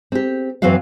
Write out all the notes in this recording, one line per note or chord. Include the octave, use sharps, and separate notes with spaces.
C4 G4
F#2 E3 F#3 C4 F#4 F5